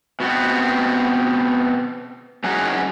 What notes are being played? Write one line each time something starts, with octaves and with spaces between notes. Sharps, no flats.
B2 B3 C4
F#3 C#4 D#4 F#4 G#4